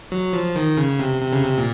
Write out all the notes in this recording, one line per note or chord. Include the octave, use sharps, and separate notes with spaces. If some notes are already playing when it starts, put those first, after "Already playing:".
F#3
F3
D#3
C#3
C3
C3
C#3
C3
A#2